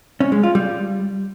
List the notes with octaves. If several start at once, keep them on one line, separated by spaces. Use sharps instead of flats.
C#4
G#3
F4
G3